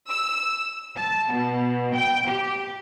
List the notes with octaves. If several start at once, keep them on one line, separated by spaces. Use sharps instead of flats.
E6
A5
B2
G5
G4